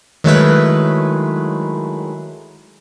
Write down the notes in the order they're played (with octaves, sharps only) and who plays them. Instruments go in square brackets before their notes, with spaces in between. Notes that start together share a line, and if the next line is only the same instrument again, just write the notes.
[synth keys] D#3 F#3 G#3 A3 E4 B4